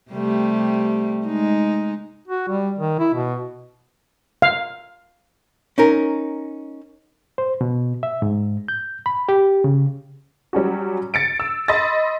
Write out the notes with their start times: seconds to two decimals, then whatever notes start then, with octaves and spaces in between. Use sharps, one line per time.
0.11 C3 G3 A3
1.26 G#3 D#4
2.27 F#4
2.48 G3
2.79 D#3
2.99 E4
3.14 B2
4.42 F5
5.78 C#4 D#4 A#4
7.38 C5
7.61 B2
8.03 E5
8.22 G#2
8.68 G6
9.06 B5
9.29 G4
9.64 C#3
10.53 F#3 G3 C#4 F#4
11.14 A6 C#7 D7
11.40 E6
11.68 D#5 B5 C6 E6 A6